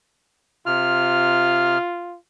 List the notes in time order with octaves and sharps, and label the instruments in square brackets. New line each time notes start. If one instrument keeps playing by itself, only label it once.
[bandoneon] C3 F6 [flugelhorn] F4